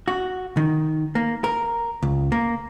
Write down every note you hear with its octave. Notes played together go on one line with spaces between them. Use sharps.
F#4
D#3
A#3
A#4
C#2
A#3